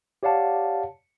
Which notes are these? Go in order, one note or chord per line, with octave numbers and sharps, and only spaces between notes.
G4 C#5 D5 F5 F#5 A5